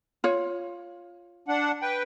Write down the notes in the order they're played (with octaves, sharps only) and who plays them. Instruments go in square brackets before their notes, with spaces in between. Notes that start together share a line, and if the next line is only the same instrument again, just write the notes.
[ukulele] F4 C#5
[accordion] D4 F#5
B4 G5